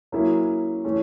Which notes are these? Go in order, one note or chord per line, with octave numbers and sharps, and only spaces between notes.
F#3 A#3 C#4 E4 G#4
E3 A3 C#4